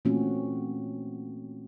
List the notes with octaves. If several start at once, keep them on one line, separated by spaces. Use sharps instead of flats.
A#2 E3 A3 C4 C#4 F#4